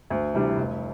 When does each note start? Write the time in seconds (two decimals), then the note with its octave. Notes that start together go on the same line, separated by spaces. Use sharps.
0.10 D2
0.34 C3 E3 G3 D4
0.56 F1